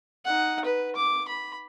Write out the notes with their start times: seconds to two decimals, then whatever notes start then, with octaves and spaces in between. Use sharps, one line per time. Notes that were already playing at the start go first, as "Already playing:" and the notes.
0.25 D#4 F#5
0.65 B4
0.96 D6
1.28 B5